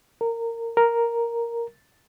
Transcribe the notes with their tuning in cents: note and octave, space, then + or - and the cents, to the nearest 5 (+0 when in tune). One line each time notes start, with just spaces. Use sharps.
A#4 -20
A#4 +0